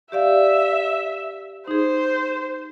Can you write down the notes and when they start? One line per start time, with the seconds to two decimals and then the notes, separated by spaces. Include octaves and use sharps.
0.12 G4 D5 E5 F5
1.68 D#4 G#4 C5